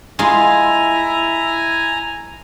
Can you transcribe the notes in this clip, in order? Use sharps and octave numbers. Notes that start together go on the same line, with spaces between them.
G#3 E4 F4 G#5 A#5